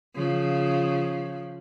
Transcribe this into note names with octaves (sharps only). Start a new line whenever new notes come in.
C#3 F3